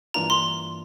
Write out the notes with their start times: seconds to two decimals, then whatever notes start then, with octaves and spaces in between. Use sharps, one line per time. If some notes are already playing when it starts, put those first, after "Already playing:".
0.14 G2 E3 A#3 D4 F4 A#5
0.30 C6